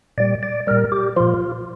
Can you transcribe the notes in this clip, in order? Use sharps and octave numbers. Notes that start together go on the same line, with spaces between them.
A#2 G3 D5
D5
A#2 G3 A#4
G4
A#2 F3 F4